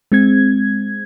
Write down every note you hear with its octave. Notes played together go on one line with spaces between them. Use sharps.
G#3 C4 G#6